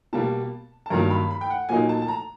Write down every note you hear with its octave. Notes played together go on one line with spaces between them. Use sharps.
B2 G3 A#3 A5
A5
G2 D#3 F#3 A#3 A#5
B5
B5
G5
F#5
A#2 F#3 A#3 D#4 G#5
A5
A5
A#5